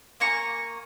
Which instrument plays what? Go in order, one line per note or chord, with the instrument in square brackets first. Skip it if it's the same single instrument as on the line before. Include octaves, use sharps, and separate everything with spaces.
[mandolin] A#3 G#5 A#5 C#6